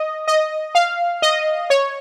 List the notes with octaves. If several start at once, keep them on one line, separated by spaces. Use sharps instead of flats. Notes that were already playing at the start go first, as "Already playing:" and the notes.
Already playing: D#5
D#5
F5
D#5
C#5